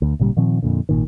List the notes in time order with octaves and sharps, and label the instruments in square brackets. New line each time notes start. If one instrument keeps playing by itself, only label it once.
[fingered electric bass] D2
G#1 A#2 C#3 G3
A#2 D#3 F3 C4
F2 A#2 D3
G#1 A#2 D#3